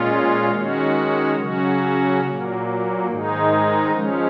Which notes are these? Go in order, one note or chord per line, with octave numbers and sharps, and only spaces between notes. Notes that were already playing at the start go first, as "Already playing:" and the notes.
Already playing: A#2 G#3 C#4 F4
D#3 G#3 C#4 F#4
C#3 F#3 C#4 F#4
A#2 F#3 A#3
G#2 D#3 G#3 D#4
F3 G#3 C#4